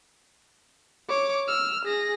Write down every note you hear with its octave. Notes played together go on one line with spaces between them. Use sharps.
C#5 D6
E6 F6
G#4 A#6